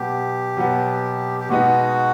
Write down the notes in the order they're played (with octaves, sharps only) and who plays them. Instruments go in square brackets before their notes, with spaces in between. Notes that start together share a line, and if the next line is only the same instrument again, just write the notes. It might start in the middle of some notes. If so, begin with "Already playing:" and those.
Already playing: [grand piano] B2 F#3 B3 [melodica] G4
[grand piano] B2 F#3 B3
[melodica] G4
[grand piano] B2 G#3 B3 D#4 [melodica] F#4